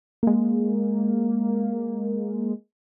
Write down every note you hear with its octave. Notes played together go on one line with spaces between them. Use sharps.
G#3 A#3